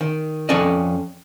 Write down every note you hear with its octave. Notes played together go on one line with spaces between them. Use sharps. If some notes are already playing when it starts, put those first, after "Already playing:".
D#3
F2 C#4 A4 D5 D#5